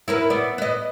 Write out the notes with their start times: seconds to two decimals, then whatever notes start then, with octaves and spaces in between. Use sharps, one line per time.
0.08 E4 A#4 B4
0.30 B3 D5
0.58 B4 D#5